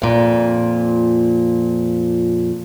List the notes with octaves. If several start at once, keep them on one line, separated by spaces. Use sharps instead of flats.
F2 A#2